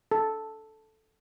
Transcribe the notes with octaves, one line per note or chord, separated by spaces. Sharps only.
A4